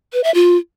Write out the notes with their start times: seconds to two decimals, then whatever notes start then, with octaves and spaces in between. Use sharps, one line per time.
0.13 B4
0.23 E5
0.34 F4